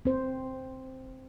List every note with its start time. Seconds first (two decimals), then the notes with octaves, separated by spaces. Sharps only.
0.05 C4 C5